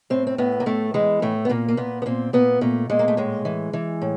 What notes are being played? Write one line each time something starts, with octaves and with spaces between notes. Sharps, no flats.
A2 C4
C4
A2 B3
A#3
A2 A3
E3 G#3
A2 A3
B3
A#2 A#3
A#3
A#2 B3
B3
A#2 C4
A#2 B3
A#2 A3
A#2 G#3
A#3
A3
A2 G#3
E3
E3
A2